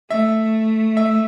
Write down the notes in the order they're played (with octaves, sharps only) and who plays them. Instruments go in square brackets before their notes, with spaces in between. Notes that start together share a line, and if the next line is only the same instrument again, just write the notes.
[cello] A3 [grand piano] E5
[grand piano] E5